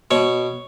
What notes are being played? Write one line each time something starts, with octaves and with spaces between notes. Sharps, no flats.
B2 C#5